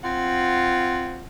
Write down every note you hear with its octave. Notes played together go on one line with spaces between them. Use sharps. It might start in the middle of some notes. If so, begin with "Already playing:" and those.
C4 F4 F#5